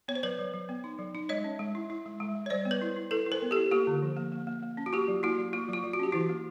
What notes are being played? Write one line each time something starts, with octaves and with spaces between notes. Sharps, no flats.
B3 C#5
C5
F#3 B4 C#5
F#3
F#3
B3
D#4
F#3
D#4
G#3 C#5 D#5
C#4
G#3
E4
E4
G#3
G#3
G#3
C#5
G3 C5 D5
B3
B4 C#5
E4
E4
E4 A4 B4
E4
A#4 C5
B3
G4 A4
E4
A#3 F4 G4
D3
F3
A#3
A#3
A#3
A#3
C#4
F#4
A#3 F4 G4
F#3
A#3 E4 F#4
F#3
A#3 F4
F#3 F4
F#3
F#4
C#4 G4
E3 E4 F#4
A#3